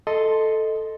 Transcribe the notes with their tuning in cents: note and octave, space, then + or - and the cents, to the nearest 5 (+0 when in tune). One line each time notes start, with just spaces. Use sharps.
A4 +0 D#5 +0 C6 +0